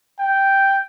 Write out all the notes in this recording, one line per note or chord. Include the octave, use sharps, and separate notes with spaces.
G5